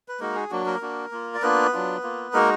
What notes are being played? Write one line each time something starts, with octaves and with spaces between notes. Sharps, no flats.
B4
G#3 A#3 D#4 F#4 A#4
G#4
F#3 A#3 D4 F#4
A#3 A#4
A#3 D4 F#4
A#3 F4
D5
A#3 B3 D4 F4 B4
F#3 D4 F4
A#3 F4
G#3 A#3 D#4 F#4 A#4